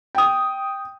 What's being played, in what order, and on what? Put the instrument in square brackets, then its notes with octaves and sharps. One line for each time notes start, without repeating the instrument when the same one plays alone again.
[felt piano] G5 D#6